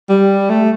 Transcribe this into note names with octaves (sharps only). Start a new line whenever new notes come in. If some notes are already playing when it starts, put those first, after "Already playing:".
G3
A3